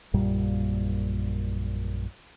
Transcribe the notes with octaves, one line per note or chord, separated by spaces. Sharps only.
A#1 F#2 A#2 G3